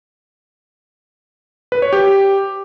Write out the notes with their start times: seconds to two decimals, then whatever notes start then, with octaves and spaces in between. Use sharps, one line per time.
1.72 B4
1.82 C#5
1.93 G4